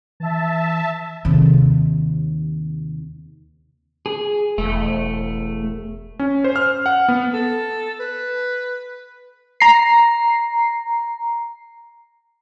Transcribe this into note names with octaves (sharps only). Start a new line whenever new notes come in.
E3 E5 A5
D#2 C3
G#4
E1 A3
C#4
C5
F6
F#5
B3
A4
B4
A#5 C7